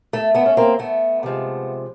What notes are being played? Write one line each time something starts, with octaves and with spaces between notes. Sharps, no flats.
A3
A3 B3
C#4
A#3 C4
A3 B3
C3 F3 G#3